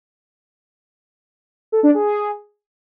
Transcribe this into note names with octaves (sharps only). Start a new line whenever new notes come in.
A4
D4
G#4